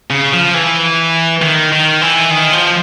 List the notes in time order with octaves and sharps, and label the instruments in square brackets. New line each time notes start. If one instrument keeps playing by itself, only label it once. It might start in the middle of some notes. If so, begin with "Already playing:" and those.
[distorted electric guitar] C#3
F3
E3
D#3
D#3
E3
D#3
F3